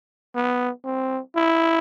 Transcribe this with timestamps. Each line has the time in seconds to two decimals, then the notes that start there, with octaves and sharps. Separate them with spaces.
0.35 B3
0.84 C4
1.36 E4